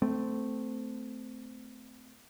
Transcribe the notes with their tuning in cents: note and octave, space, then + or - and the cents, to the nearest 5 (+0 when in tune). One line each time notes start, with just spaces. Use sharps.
A3 +0 C4 -20